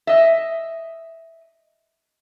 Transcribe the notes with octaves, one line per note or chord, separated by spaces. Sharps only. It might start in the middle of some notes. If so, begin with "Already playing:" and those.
D#5 E5